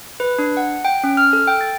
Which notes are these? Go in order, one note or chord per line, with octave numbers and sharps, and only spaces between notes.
B4
D4
F#5
G5
C#4
F6
A4
G5
A6